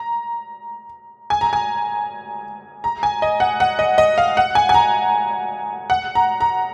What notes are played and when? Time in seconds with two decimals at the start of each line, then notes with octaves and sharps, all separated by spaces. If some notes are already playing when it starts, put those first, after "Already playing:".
Already playing: A#5
1.30 G#5
1.41 A#5
1.53 G#5
2.84 A#5
3.03 G#5
3.22 D#5
3.40 F#5
3.60 F#5
3.79 D#5
3.98 D#5
4.18 F5
4.37 F#5
4.55 G#5
4.69 G#5
4.74 A#5
5.90 F#5
6.15 A#5
6.41 A#5